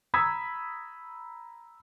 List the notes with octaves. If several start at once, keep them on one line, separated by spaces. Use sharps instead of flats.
A#5 B5 D#6 E6 G#6 B6